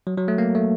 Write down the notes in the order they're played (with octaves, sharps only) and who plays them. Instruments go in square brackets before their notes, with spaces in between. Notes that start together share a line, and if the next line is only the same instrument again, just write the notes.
[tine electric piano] F#3
F#3
A3
A#3
A3